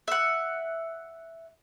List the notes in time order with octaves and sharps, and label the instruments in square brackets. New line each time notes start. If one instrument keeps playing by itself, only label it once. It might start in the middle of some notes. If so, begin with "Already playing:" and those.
[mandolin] E5 F#5